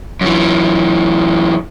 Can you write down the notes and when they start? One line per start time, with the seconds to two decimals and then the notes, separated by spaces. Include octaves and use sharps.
0.21 F#2 E3